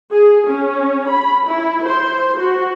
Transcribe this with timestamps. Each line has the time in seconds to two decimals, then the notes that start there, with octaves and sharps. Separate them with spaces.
0.11 G#4
0.48 C#4
1.08 B5
1.46 E4
1.86 C5
2.38 F#4